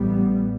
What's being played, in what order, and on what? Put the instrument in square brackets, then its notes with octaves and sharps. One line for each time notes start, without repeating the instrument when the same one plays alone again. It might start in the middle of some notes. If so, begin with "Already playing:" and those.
Already playing: [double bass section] A1 A2 G3 B3